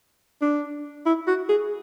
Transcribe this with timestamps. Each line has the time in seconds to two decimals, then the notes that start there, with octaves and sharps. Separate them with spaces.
0.42 D4
1.06 E4
1.27 F#4
1.49 G#4